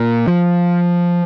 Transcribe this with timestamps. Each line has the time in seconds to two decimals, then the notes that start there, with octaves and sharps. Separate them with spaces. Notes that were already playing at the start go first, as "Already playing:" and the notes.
Already playing: A#2
0.28 F3